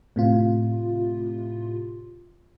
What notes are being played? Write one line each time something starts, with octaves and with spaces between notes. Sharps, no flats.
A2 C3 F4